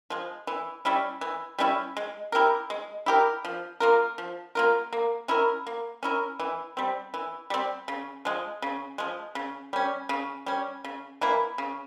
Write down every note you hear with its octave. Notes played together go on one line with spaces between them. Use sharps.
F3 G#3
E3
G3 C#4 E4
E3
G3 C#4 E4
G#3
E4 G4 A#4
G#3
E4 G4 A#4
F3
A#3 F4 A#4
F3
A#3 F4 A#4
A#3
C#4 E4 A#4
A#3
C#4 E4 A#4
E3
G3 C4
E3
G3 C4
C#3
F3 G#3
C#3
F3 G#3
C#3
G3 C#4
C#3
G3 C#4
C#3
E3 A#3 E4
C#3